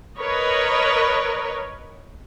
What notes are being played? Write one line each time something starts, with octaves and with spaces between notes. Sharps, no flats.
A#4 B4 C#5 D#5